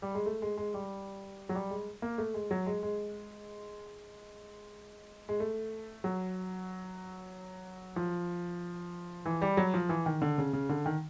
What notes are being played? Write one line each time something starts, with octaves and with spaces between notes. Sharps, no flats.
G3
G#3
A3
G#3
G#3
G3
F#3
G3
G#3
A#3
A3
G#3
F#3
G#3
G#3
G#3
A3
F#3
F3
E3
G3
F#3
F3
E3
D#3
D3
C#3
C#3
D3
D#3